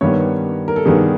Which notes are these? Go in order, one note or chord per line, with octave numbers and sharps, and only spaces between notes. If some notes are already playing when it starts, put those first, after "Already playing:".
G2 D#3 G3 B3 C#5
A#4
A4
G2 D#3 G3 B3 G#4